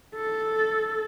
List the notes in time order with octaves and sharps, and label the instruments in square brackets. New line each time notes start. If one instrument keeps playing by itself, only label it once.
[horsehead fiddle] A4